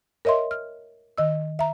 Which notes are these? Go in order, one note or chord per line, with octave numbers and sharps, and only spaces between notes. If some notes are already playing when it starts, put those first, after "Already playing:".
A#4 C#5 D#5 E5 C6
F6
D#3 D#5 E6
E5 A#5